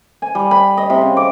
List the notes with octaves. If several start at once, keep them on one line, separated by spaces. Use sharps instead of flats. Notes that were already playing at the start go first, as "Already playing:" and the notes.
G#5
G3
B5
D#5
C3
C#3
D6